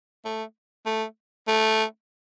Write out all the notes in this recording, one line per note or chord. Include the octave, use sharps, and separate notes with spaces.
A3
A3
A3